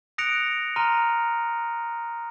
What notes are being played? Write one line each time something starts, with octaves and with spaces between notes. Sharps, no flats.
D#6 F#6 A#6 C#7 D7 F7
A#5 C6 F6 D#7